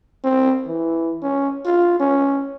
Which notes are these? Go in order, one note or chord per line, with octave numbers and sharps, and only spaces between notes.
C4
E3
C#4
F4
C#4